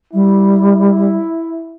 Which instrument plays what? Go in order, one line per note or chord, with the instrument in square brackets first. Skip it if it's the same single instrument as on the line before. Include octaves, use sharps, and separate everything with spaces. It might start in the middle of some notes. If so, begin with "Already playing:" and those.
[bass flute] G3 [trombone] E4